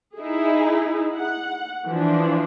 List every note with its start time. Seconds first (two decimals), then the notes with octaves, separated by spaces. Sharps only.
0.18 D#4 E4 G#4
1.14 F#5
1.86 E3 F3 D4